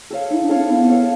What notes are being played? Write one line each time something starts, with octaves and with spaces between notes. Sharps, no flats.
A4 C#5 F5
D#4 E4
D4
A4 C#5 F5
C4
B3 E4
A4 C#5 F5